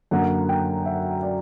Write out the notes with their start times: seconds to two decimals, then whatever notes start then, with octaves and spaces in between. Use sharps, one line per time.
0.11 F#2 D3 F#3 A#3 F#5
0.49 G5
0.86 E5
1.23 D5